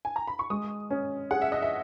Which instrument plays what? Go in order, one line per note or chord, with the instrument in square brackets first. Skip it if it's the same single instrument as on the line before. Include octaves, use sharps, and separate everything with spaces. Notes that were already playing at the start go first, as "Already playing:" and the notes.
[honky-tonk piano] G#5
A#5
B5
C#6
[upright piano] G#3 [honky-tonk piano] D#6
[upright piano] C#4
[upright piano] G#4 [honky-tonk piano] F#5
[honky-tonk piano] E5
D#5
E5